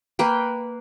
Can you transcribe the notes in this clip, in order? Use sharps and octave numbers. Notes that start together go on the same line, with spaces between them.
A#3 B4 G5